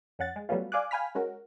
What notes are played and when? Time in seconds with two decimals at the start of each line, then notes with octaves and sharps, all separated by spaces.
0.19 F2 C#4 F#5 A6
0.36 G#3
0.49 F#3 G3 A3 B3 C#4 F4
0.72 D5 F5 G#5 D6 F#6
0.91 F5 G5 G#5 B5 F6 B6
1.15 G#3 C#4 F#4 A#4